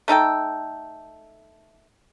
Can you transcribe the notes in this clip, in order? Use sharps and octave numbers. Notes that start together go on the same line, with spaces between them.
A3 D#4 A4 G5